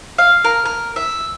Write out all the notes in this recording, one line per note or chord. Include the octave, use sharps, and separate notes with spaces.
F5
A#4
A#4
E5